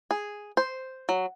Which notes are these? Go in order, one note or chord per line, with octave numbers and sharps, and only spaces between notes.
G#4
C5
F#3